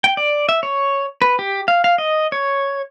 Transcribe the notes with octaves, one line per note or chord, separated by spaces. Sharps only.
G5
D5
E5
C#5
B4
G4
F5
F5
D#5
C#5